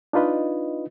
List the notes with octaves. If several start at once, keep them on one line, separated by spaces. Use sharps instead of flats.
D4 D#4 F4 B4 D#5